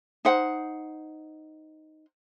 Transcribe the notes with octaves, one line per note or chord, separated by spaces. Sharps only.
D#4 C5 F#5